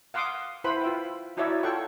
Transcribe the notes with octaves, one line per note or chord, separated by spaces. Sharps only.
F5 F#5 C6 D6 D#6
E4 B4 C5 F#5 B5
F4 E5 G5
D#4 E4 F#4 C#5 D5 E5
F4 A4 C#5 F#5 G5 C#6